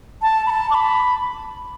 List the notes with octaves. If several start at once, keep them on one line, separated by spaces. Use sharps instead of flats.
A5
B5
A5
D6
B5